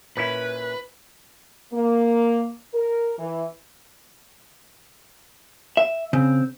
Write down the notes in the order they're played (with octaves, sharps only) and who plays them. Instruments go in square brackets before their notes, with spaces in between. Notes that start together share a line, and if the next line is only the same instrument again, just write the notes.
[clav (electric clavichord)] A#2 C#4 E4 [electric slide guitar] B4
[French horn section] A#3
A#4
E3
[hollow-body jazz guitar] E5
[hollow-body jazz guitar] C#3 [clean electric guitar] C4